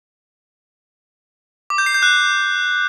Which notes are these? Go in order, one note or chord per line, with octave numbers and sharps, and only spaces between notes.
D6
G6
C7
G6
F#6